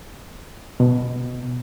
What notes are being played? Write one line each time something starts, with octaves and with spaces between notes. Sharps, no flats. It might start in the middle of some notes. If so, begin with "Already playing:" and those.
B2